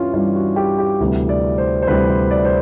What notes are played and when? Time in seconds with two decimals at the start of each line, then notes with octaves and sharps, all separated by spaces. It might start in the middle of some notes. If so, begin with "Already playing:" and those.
Already playing: G2 E3 G3 C#4 F4
0.13 G2 E3 G3 F4
0.35 F#4
0.56 G4
0.78 G4
1.00 D2 C3 E3 G3
1.29 D5
1.58 C5
1.82 C5
1.87 D2 C3 E3 G3 B4
2.09 C5
2.31 D5
2.45 C5